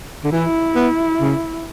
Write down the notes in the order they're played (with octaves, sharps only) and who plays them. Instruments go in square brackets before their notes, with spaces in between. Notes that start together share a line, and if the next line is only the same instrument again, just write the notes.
[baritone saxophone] D3
[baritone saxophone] E3 [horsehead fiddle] E4
[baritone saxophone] B3
C#3